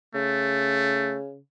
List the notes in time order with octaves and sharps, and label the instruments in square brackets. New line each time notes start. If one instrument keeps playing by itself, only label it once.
[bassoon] C#3 [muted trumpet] A3